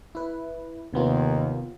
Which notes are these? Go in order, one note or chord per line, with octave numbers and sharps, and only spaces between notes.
E4 B4
D#2 C3 B3 F4